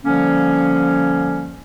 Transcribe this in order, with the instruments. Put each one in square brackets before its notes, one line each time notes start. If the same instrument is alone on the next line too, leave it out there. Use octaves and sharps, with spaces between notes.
[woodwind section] D3 F3 G3 A#3 C#4